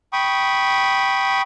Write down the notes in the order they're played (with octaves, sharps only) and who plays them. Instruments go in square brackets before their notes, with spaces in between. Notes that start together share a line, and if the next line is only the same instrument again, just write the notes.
[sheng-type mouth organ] G5 B5 C#6 D#6